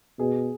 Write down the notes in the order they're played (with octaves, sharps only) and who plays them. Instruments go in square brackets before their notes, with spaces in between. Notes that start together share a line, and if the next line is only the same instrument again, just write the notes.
[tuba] B2 [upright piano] G#4